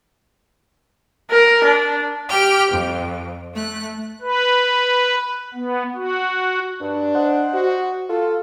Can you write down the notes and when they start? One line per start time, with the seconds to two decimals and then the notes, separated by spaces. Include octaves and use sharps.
1.30 A#4
1.64 D4
2.29 G4 G5 F6
2.71 F2
3.54 A3 F#6
4.21 B4
5.54 B3
5.95 F#4
6.81 G2 D4
7.15 C5 D#5 F#5
7.54 F#4
8.10 F4 A4